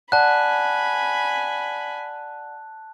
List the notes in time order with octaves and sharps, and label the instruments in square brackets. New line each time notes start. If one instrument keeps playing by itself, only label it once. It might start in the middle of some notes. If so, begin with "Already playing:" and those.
[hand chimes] D5 F#5 [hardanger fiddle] G#5 B5 [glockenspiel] A5 F#6